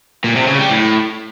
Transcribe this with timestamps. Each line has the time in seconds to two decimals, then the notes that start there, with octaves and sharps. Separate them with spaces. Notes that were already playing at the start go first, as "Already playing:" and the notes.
0.24 A#2
0.36 C3
0.47 C#3
0.59 G3
0.70 A2